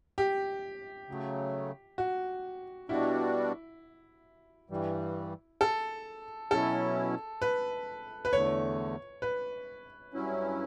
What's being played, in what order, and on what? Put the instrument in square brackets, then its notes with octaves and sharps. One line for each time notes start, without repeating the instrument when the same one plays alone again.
[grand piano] G4
[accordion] C#3 F#3 A3
[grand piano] F#4
[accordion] B2 G3 D4 F#4 [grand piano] E4
[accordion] G2 E3 G3
[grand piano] A4
[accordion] B2 F#3 C#4 E4 [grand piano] A4
[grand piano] B4
B4
[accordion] E2 D3 A3 [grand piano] C#5
[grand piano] B4
[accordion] G2 F#3 C#4 E4